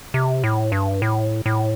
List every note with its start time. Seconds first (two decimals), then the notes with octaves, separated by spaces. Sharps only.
0.14 C3
0.44 A2
0.72 G2
1.02 A2
1.46 A2